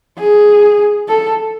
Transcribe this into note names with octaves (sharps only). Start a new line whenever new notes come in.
G#4
A4